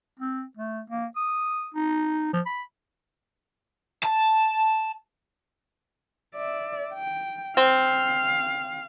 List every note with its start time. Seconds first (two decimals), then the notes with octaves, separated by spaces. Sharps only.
0.19 C4
0.57 A3
0.90 A#3
1.16 D#6
1.74 D#4
2.33 F3
2.46 B5
4.03 A5
6.35 D5 E5
6.94 G5
7.57 C4 F5